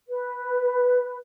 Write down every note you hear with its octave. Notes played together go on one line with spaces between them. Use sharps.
B4